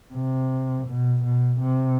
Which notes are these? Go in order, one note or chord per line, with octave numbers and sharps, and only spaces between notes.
C3
B2
B2
C3